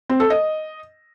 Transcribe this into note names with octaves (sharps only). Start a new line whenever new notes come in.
C4
A4
D#5